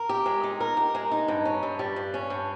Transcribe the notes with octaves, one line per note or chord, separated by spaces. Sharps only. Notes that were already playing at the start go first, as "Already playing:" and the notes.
Already playing: A#4
G4
G#3
D#4
A#4
G4
G#3
D#4
G2
C#4
G2
G3
G2
C#4
G2